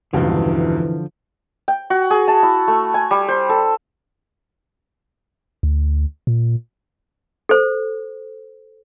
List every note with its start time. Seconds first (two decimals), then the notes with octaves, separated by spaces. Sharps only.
0.13 E1 C#2 G2 D3 E3 F3
1.68 G5
1.90 F#4
2.10 G#4
2.28 A5
2.43 E4
2.68 A3
2.94 G#5
3.11 G3
3.28 C5
3.49 A4
5.63 D2
6.27 A#2
7.49 A4 C5